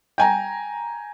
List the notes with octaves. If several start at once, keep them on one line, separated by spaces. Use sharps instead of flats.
G5 G#5 A#5